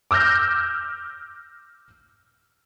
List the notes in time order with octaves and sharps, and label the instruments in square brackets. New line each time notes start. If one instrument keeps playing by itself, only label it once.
[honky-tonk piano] D6 E6 F6 G6 A#6